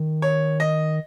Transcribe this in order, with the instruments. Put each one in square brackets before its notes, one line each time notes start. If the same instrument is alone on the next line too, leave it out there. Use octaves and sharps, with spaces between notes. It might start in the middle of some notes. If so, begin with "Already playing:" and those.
Already playing: [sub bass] D#3
[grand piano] C#5
D#5